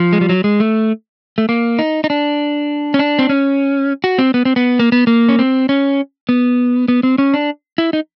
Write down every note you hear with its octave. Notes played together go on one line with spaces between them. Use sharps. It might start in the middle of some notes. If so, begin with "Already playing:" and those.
Already playing: F3
G#3
G3
F#3
G#3
A3
A3
A#3
D#4
D#4
D4
C#4
D4
C4
C#4
F#4
C4
B3
C4
B3
A#3
B3
A#3
C#4
C4
C#4
B3
B3
C4
C#4
D4
E4
D#4